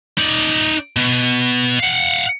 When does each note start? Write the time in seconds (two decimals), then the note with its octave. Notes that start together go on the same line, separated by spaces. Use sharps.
0.18 D#4 D5
0.96 B2
1.79 F5 F#5